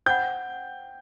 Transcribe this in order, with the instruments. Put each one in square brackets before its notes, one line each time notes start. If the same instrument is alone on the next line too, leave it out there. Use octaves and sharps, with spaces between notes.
[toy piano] C5 F#5 B5 [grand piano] G5 G6